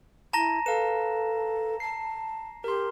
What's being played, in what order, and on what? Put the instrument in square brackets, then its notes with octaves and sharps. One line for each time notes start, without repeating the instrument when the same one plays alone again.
[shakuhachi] E4 [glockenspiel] A5 A#5 A#6
[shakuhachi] A4 [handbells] B4 F5 [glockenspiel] E7
[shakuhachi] A5 [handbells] C7
[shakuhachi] G4 [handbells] A#4 C6